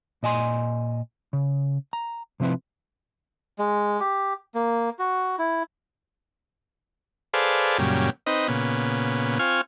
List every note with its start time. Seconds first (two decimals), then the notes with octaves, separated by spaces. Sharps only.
0.23 A#2 D#5 G#5 C6
1.33 C#3
1.93 A#5
2.40 C3 F3 C4 E4 B4
3.59 G#3
4.00 G4
4.55 A#3
4.99 F#4
5.38 E4
7.34 G#4 A4 B4 C5 D5 F5
7.79 F#2 A#2 C#3 G3
8.26 C4 D#4 B4 D#5
8.48 A#2 C#3 B3
9.39 C4 F4 G#5 C#6 F6